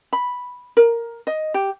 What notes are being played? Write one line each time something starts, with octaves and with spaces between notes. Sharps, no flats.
B5
A#4
D#5
G4